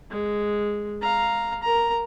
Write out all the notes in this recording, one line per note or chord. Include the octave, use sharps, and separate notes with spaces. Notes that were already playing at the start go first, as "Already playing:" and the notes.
G#3
F5 A#5
A#4 A#5